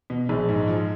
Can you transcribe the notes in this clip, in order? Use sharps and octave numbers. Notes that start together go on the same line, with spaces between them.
B2
A#1 G#3
G#2
F3